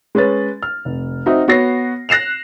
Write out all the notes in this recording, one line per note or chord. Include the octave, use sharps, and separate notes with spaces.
G#3 C#4 B4 A6
F6
F1
C4 D#4 F#4 E5
B3 F#4 C#5 A#6 C7
F#6 A#6 C7 E7 F7